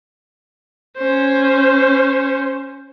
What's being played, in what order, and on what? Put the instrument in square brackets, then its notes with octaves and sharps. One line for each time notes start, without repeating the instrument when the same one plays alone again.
[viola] C#4 C5